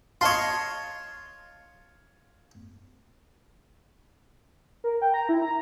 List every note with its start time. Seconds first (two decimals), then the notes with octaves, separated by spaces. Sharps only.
0.21 F4 C#5 D#5 A5 C6
4.84 A#4
5.02 G5
5.14 A#5
5.29 E4
5.42 A#5